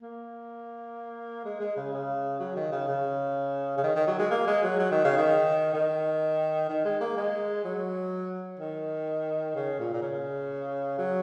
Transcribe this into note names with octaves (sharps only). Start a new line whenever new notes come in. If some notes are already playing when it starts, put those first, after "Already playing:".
A#3
G#3
G#3
C#3
C#3
F#3
D#3
C#3
C#3
C#3
D#3
D#3
F#3
G#3
A#3
G#3
F#3
F#3
D#3
C#3
D#3
D#3
D#3
G#3
A#3
G#3
F#3
D#3
C#3
A#2
A#2
C#3
F#3